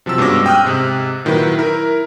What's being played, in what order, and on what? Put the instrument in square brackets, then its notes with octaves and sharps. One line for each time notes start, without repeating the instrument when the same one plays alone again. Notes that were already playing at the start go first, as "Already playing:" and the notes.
[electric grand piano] C3 F3 F#3 E6
G2 B2 G#3 C#4 D6 A#6
G5 D#6 F6 F#6
G#2 C3
A#2 D#3 F#3 E4 B4
E4 A#4